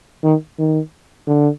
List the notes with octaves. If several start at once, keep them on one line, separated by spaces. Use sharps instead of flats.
D#3
D#3
D3